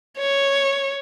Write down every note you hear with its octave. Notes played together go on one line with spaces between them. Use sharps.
C#5